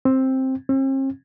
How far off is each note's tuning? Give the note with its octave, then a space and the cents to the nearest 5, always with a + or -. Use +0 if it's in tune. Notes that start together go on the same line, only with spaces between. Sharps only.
C4 +10
C4 +45